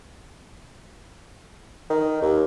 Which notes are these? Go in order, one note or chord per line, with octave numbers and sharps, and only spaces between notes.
D#3
D#2